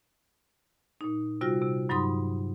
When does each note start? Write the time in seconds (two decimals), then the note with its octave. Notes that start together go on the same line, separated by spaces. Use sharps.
1.01 A#2 D#4
1.41 C3 G3 F4 F#4 F6 A#6
1.62 C3
1.89 G2 F#3 D#4 B5 C6 D#6